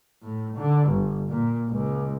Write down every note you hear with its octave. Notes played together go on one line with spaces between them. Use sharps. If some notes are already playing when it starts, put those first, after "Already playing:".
A2
D3
G1
A#2
C#2